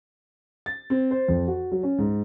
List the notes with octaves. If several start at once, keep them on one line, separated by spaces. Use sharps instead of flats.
A6
C4
C5
F2
F#4
F#3
C#4
G#2